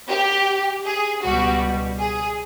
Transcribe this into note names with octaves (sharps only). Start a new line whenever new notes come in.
G4
G#4
C#2 B2 G3 F#4
G#4